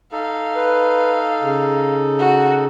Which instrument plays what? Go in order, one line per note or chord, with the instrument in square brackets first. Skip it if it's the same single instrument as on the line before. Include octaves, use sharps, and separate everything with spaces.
[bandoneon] D#4 A4 [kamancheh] F5
[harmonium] B4
C#3
[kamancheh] F#4